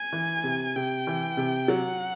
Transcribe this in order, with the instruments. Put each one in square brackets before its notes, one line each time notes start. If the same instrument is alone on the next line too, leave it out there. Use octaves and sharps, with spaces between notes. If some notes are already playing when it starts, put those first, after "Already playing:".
Already playing: [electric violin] G#5
[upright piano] E3
C3
[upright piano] C3 [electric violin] G5
[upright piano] E3
C3
[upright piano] F#3 [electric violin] F#5